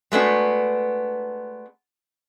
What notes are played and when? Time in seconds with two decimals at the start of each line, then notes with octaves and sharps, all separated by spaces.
0.12 G#3 A3 B3 D4 F#4